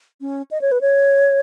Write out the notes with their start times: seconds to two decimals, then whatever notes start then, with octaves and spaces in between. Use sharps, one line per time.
0.21 C#4
0.51 D#5
0.61 C#5
0.72 B4
0.81 C#5